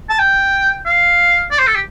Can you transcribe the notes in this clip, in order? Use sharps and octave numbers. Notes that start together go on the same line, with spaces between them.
A5
G5
F5
D5
C5
A4
G4